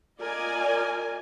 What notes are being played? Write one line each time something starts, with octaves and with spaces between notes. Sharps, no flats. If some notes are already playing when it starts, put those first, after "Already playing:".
F4 A#4 D5 D#5 G#5